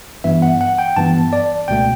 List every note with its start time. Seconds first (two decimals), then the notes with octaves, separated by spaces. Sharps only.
0.24 G2 E3 B3 E5
0.42 F#5
0.61 F#5
0.79 G5
0.96 G2 E3 B3 A5
1.33 D5
1.68 C#2 B2 A3 G5